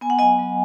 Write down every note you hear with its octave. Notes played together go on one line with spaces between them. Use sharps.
B3 G#5
F#5
F#3 D#5 G#5
F#3